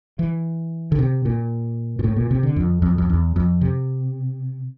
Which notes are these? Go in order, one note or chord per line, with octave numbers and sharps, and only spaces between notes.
E3
D3
C3
A#2
A#2
A2
A#2
C3
D3
F2
F2
F2
E2
F2
C3